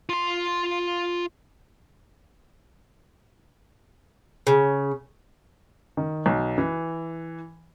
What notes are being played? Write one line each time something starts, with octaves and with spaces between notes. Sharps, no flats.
F4 C6
C#3
D#3
B1
E3